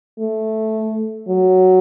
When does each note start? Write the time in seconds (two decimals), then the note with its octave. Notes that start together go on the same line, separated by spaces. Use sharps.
0.19 A3
1.28 F#3